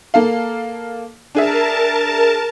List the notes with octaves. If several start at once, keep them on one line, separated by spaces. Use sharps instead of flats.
A#3 A4 F5
D4 G#4 A#4 E5 A5